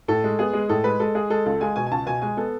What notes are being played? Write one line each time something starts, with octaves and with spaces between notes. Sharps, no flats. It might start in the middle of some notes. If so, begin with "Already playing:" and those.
A2 A4
G#3
B3 G#4
G#3
A2 A4
G#3 B4
G#3 A4
G#3 G#4
G#3 A4
C#2 A4
G#3 G#5
B2 G#5
G#5
C#2 A5
B2 G#5
G#3 G#5
B3 A4